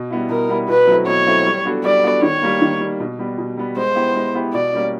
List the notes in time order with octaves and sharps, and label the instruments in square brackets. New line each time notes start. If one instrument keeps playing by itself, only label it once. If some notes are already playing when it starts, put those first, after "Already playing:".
Already playing: [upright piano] B2
G3 B3 E4
[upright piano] B2 [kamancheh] A#4
[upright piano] G3 B3 E4
[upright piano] B2 [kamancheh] B4
[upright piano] F#3 A3 C4 E4
[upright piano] B2 [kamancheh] C#5
[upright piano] F#3 A3 C4 E4
G3
B3 D4 F#4 A4
[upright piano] G3 [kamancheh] D5
[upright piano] B3 D4 F#4 A4
[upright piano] D#3 [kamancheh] C#5
[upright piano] G3 A#3
D#3
G3 A#3
B2
G3 B3
B2
G3 B3
[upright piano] G#3 [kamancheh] C5
[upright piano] B3 E4 G4
G#3
B3 E4 G4
[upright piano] B2 [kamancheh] D5
[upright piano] G3 A#3 C#4